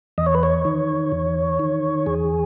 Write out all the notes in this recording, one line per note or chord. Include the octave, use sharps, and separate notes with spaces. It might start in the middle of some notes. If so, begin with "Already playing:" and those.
E2 D#5
C#5
B4
C#5
D#3
E2
D#3
E2 G#4